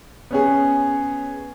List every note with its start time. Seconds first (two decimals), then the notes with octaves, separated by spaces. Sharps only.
0.31 B3 C#4 G#4